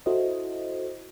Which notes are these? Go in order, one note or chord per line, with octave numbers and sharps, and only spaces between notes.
E4 F#4 A4 C5 D#5